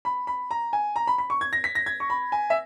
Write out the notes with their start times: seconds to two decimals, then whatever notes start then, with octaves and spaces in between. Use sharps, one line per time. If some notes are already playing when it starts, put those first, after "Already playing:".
0.05 B5
0.27 B5
0.51 A#5
0.73 G#5
0.96 A#5
1.07 B5
1.18 B5
1.30 C#6
1.41 G#6
1.53 A#6
1.64 B6
1.75 A#6
1.86 G#6
2.00 C#6
2.10 B5
2.32 G#5
2.50 E5